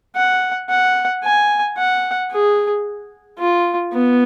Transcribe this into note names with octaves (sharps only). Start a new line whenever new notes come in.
F#5
F#5
G#5
F#5
G#4
F4
B3